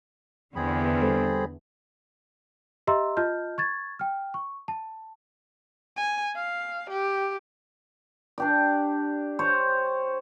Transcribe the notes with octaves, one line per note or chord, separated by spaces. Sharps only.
E2 D3 C4 G#4 B5
G3 A4 C5
G4 D#5 E5 A#5 C6 E6
F4 D#5 A5 F6 G6
C#6 G#6 A6
G5 F6
C#6
A5
G#5
F5
G4
D4 G4 D5
C5 C#5